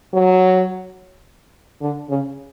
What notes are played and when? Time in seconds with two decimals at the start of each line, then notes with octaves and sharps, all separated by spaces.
0.14 F#3
1.81 D3
2.09 C#3